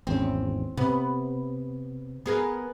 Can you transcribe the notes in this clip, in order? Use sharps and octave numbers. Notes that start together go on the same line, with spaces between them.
G#1 E2 C4 C#4
C3 B3
B3 G#4 A#4